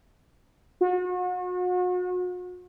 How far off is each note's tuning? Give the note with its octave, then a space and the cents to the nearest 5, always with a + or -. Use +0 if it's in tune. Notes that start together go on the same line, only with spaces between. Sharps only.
F#4 -40